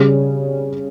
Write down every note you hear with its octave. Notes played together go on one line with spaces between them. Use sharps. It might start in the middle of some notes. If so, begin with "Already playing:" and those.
Already playing: C#3 G3 C#4 G#4